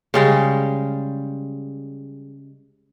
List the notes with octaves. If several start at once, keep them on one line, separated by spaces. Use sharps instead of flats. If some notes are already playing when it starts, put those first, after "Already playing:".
C#3 G3 G#3